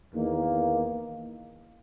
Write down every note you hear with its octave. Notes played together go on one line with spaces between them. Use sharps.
E2 D#3 A#3